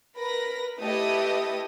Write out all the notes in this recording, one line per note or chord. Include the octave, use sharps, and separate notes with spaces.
A#4 B4 B5 A#6
A3 E4 G4 B4 D#5 D#6